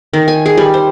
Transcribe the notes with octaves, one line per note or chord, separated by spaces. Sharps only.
D#3
G#5
G#4
G3
C5